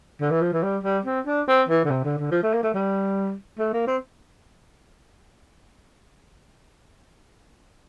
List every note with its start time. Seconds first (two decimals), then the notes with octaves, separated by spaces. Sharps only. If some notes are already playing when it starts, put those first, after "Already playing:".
0.21 D3
0.31 E3
0.41 F3
0.52 E3
0.63 G3
0.83 G3
1.05 C4
1.26 D4
1.48 C4
1.69 E3
1.84 D3
1.90 C3
2.04 D3
2.18 D3
2.31 F3
2.43 A3
2.53 A#3
2.63 A3
2.74 G3
3.58 A3
3.73 A#3
3.87 C4